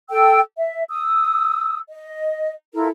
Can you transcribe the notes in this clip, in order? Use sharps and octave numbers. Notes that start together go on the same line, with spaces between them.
A4 G5 E6
E5
D#6 E6
D#5
E4 F4 A4 A#4